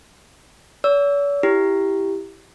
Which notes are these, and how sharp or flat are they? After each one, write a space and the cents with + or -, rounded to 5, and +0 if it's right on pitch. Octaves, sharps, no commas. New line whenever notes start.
C#5 +45 E6 +0
E4 +0 G4 +0